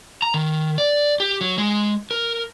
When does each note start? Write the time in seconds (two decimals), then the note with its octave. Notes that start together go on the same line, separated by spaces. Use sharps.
0.22 A#5
0.34 D#3
0.78 D5
1.20 G4
1.41 F#3
1.58 G#3
2.11 A#4